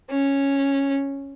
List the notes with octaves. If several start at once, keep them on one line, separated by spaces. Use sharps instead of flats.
C#4